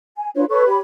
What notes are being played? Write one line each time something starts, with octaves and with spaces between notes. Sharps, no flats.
G#5
D4 F4 B4 C#5
A4 B4 C#5 C#6
G4 C#5 B5